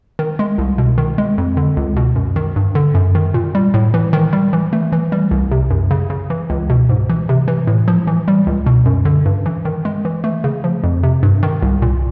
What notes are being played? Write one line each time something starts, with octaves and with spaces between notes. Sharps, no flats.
D#3
G#3
C2
B2
D#3
G#3
F2
D3
C#2
B2
F#2
D#3
G2
D3
F#2
D#3
A#2
G3
A2
E3
D#3
G3
E3
A3
E3
G3
C2
C3
F#2
C#3
C#3
E3
C#2
B2
G#2
E3
C3
E3
A2
F3
E3
G3
C#2
B2
F#2
D3
G2
E3
D#3
G#3
E3
A3
C#3
F3
F2
C3
G2
D#3
C2
A#2